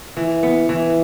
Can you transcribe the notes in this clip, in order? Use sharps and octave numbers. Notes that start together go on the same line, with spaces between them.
E3
B3
E3